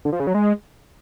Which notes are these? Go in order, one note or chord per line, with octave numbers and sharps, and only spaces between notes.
D3
F3
C#3
F#3
G#3